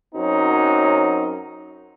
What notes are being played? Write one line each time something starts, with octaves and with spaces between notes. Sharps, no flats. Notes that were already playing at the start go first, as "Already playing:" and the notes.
F#2 F#3 C4 D#4